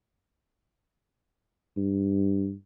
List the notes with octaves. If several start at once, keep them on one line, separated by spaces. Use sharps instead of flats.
G2